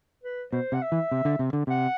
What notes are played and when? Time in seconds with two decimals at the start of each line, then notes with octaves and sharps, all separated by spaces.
0.24 B4
0.52 B2 C5
0.72 C3 F#5
0.82 E5
0.92 E3
1.11 C3
1.25 D3
1.39 C3
1.53 D3
1.67 C3 F#5